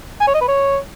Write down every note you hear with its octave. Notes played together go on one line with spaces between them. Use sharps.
G#5
C#5
D#5
B4
C#5